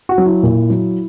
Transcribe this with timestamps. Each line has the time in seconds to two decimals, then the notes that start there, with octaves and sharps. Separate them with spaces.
0.09 F#4
0.18 F#3
0.26 E4
0.43 A#2
0.70 F#3